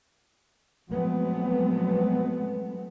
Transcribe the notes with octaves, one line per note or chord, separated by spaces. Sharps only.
F3 F#3 G#3 A3 B3 C4